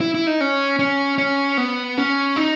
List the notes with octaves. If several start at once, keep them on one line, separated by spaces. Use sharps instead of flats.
E4
E4
D#4
C#4
C#4
C#4
B3
C#4
D#4